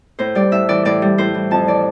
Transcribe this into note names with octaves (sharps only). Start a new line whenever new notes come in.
A2 C5
G3 D5
A2 E5
E3 D5
A2 D5
G3
A2 C5
E3
F2 A5
E3 D5